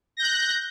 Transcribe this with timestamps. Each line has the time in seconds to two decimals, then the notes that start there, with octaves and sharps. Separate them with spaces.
0.17 A#6
0.19 G6
0.22 F#6